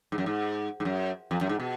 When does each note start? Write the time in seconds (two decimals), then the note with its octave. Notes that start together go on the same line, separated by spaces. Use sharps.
0.12 G#2
0.18 F#2
0.26 G#2
0.80 G#2
0.85 F#2
1.31 F2
1.41 F#2
1.49 G#2
1.60 B2